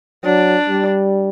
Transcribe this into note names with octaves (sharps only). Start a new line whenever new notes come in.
F#3 D4
G3